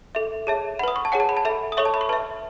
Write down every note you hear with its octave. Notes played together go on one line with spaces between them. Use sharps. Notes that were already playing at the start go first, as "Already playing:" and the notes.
A4 E5
G#4 C#5 E5 A5
B4 F#5 B5 D#6
C#6
A5
G#4 C#5 F#5 G#5
A5
B5
A5
A4 E5 B5
D#6
A4 C#5 E5 C#6
A5
B5
C#6
B4 E5 A5